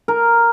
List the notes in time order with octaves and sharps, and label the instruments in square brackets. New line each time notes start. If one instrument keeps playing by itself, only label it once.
[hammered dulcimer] A#4